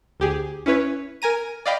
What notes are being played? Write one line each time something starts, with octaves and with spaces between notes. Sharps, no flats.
D2 G4 G#4
C#4 E4 B4 C#5
A#4 G#5 A#5 D#7
D5 D#5 F5 G5 B5